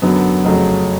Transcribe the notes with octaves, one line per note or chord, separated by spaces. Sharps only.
F#2 D3 F#3 B3
F2 C#3 F#3 A3